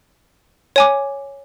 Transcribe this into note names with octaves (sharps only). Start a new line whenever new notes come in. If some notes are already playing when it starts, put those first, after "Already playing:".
C#5 G#5 D6